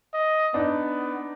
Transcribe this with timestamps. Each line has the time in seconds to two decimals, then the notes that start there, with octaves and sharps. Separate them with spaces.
0.13 D#5
0.54 B3 D4 D#4